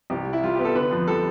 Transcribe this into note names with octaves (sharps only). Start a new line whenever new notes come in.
C2 G4
G3
E4
G3 F4
B3 G4
A4
D3 B4
F2
G3 A4